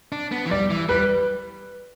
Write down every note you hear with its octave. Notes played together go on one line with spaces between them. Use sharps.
D4
B3
E3
G3 D5
E3
G3 B4